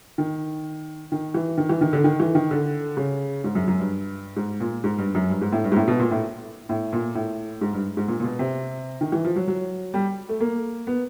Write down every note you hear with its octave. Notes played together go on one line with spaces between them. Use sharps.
D#3
D#3
E3
D#3
E3
D#3
D3
D#3
E3
D#3
D3
C#3
G#2
F#2
F#2
G2
G#2
A#2
G#2
G2
F#2
G2
G#2
A2
G2
G#2
A2
B2
A#2
A2
A2
A#2
A2
G#2
G2
G#2
A#2
A#2
B2
C3
D#3
E3
F3
F#3
F#3
G3
A3
A#3
B3